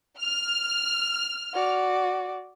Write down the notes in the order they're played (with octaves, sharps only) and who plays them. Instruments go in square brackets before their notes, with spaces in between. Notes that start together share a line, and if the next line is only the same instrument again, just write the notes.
[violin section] F6
[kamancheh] F#4 D5